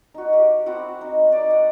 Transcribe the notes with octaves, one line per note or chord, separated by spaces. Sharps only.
D#4 F#4
G4
C4 E4 F#4 F#5
D#4
D#4 D5 F5
F#5